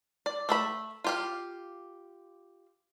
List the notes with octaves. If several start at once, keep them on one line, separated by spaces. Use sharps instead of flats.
D5
A3 E5 B5
F4 G4 F5